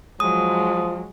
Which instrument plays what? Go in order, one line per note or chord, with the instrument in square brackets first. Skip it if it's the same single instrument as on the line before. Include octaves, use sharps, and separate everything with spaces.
[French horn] F3 [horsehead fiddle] F#3 G#3 [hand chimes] D#6